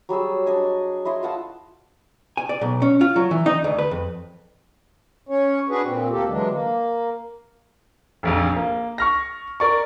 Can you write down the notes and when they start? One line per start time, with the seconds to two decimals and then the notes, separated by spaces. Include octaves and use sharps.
0.09 F#3 G3 G#4 E6
0.46 D4 D#5 G#5
1.05 E4 C#5 D#5 C6
1.23 F4 F#5 A5 E6
2.37 G#5
2.49 D5
2.61 B1
2.82 C#4
3.01 F4
3.16 F#3
3.31 E3
3.46 D#4
3.64 D2
3.78 B4
3.91 F2
5.29 C#4 C#5
5.69 D4 F#4 G#4 B4
5.83 A#2 C4
6.11 D2 A#3 G4 A4
6.29 D3 E3 F#3 G#3 D4
6.50 A#3
8.23 F1 A#1 F2
8.57 A#3
8.98 C#6 F6 A#6
9.60 A#4 D5 C#6